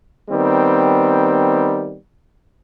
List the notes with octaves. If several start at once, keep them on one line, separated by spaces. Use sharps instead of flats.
D#3 G3 B3 C4